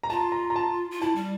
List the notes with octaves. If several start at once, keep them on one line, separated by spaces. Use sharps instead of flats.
A#5
F4 A5
A#5
A#5
A5
F4
E4 A5
G3